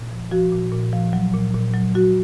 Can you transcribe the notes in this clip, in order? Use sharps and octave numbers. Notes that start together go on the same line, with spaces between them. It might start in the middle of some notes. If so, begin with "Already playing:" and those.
Already playing: A#2
F3
F3 F#4
A#2
A#2
F3
F#3
A#2
A#2
F#3
F#3 F#4